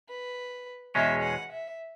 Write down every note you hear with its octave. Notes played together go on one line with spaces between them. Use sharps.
B4
E2 B2 G#3 C#4 E5
F#5
E5